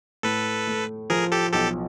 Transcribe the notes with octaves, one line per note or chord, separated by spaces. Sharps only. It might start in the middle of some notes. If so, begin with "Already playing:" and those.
A2 A4 B4
A3
F3 G#4 A#4
G4 A4
B1 G4 A4